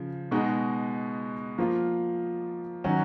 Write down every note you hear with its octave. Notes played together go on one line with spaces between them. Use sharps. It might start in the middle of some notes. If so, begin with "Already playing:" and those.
Already playing: C#3 F3
B2 G#3 D#4 F#4
F3 A#3 F4
D#3 F#3 C#4 F#4